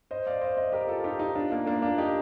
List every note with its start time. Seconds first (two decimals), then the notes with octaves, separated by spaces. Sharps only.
0.11 C5 D#5
0.27 D5 F5
0.41 C5 D#5
0.57 C5 D#5
0.72 G4 A#4
0.88 F4 A4
1.04 D#4 G4
1.19 D#4 G4
1.35 D4 F4
1.52 A#3
1.66 A#3 D4
1.82 D4 F4
1.98 D#4 G4